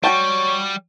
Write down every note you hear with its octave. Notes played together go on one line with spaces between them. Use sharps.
G3 F#4 C#5 G5 A5